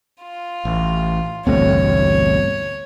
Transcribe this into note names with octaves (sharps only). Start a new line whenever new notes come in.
F4
A1
A1 D2 G2 B2 A3 C4 C#5